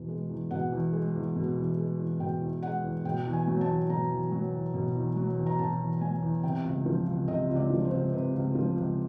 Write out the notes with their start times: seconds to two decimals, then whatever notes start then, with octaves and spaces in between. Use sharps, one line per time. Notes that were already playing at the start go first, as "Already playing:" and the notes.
Already playing: E2 B2
0.09 G#3
0.30 E2
0.51 B2 F#5
0.72 E2
0.93 G#3
1.15 E2
1.36 B2
1.57 E2
1.78 G#3
1.99 E2
2.20 B2 G5
2.41 E2
2.62 G#3 F#5
2.84 E2
3.05 B2 G5
3.26 E2
3.33 G#5
3.47 F#3
3.61 A5
3.68 E2
3.89 B2 A#5
4.10 E2
4.32 F#3
4.53 E2
4.74 B2
4.95 E2
5.16 F#3
5.38 E2
5.46 A#5
5.59 B2 A5
5.80 E2
6.01 F#3 G#5
6.22 E2
6.43 C3 G5
6.65 C#2
6.86 F3
7.07 C#2
7.28 C3 D#5
7.49 C#2
7.56 D5
7.70 F3
7.85 C5
7.91 C#2
8.12 C3 B4
8.34 C#2
8.55 F3
8.76 C#2